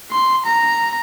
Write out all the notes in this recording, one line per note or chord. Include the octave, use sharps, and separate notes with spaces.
C6
A#5